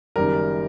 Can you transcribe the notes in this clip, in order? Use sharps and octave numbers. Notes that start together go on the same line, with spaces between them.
F#1 F#2 D#3 G3 A#4